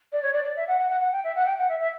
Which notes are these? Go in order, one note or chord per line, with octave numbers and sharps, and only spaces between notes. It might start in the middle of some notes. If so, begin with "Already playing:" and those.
D5
C#5
D5
D5
E5
F#5
F#5
F#5
F#5
G5
E5
F#5
G5
F#5
E5
E5